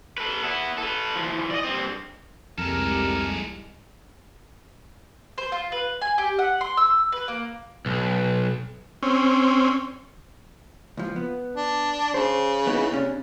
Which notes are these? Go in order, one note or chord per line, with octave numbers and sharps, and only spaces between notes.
A4 B4
B3 E4
A4 B4
E3 F3
D5 D#5
G2 C4
C2 F2 G#2 G3 G#3 A4 A#4
C5
F4
B4
G#5
G4
F#5
C6
E6
B4
A#3
B1
C4 C#4
C#2 F3
B3
D4
C#3 C5
B3 D#4 E4
C3 C#4 D4